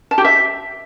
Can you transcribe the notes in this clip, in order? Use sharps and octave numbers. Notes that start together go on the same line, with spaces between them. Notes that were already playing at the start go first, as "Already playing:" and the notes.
A5
G4
E5